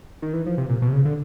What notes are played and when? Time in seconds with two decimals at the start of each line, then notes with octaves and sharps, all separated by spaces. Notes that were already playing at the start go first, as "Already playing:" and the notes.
0.22 D#3
0.33 E3
0.46 F3
0.58 C3
0.69 A#2
0.82 B2
0.88 C3
0.93 C#3
1.05 D3